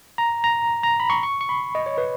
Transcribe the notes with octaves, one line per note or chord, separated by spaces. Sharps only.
A#5
A#5
A#5
B5
C#6
C#6
C#6
B5
D#5
C#5
B4